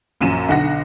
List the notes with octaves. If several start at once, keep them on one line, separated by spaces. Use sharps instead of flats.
A#1 F#2 D#7 E7
B1 D3 F#5 A#6